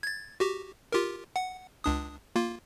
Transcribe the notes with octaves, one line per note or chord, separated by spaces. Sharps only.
G#6 A6
F#4 G4
F4 G4 A#4
F#5
C#2 D4 D#6
A#3 F4